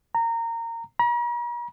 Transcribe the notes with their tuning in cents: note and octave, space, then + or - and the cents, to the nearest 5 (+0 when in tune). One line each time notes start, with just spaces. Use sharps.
A#5 -20
A#5 +45